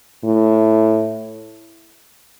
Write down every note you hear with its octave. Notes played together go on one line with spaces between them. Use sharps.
A2